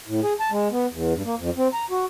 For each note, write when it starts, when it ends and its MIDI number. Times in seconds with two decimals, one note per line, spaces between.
0.07 0.21 45
0.23 0.33 68
0.40 0.50 81
0.51 0.68 56
0.71 0.86 59
0.91 1.14 40
1.14 1.22 43
1.25 1.35 58
1.38 1.50 41
1.57 1.68 60
1.73 1.85 82
1.90 2.05 66